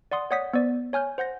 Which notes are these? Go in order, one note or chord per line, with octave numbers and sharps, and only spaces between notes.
D5 F#5 C6 D#6
C#5 D5 F#5 D#6 G6 B6
B3 C5 D5
C#5 G#5 F6 G6
C5 F#5 G6 A#6